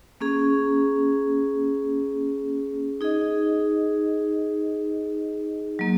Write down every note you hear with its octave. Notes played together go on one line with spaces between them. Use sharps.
A#3 C#4 G#4
D#4 G#4 D#5
F#3 A#3